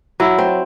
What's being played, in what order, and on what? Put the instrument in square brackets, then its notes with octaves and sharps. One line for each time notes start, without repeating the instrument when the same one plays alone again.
[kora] F#3 [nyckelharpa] E4
[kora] C4